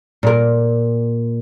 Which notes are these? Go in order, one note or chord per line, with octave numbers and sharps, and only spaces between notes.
A#2 A#4